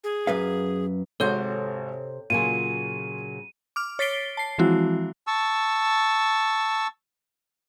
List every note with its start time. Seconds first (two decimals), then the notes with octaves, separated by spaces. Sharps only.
0.04 G#4
0.27 F#2 B4 F5
1.20 G#1 G#2 C3 F#4 A4 C5 C#5 G6
2.30 A#2 C#3 F#3 F4 G#5 D#7
3.76 D6 F6
3.99 C#5 A6 B6 C7 D7 G7
4.37 A5 C7
4.58 E3 F3 G#3 C4 E4 F#4
5.27 A5 C#6 E6